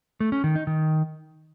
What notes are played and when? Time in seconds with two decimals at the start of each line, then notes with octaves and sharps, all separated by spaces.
0.20 A3
0.32 C#4
0.44 D#3
0.55 D#4
0.67 D#3